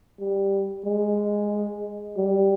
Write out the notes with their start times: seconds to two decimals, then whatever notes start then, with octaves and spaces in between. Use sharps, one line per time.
0.19 G3
0.85 G#3
2.17 G3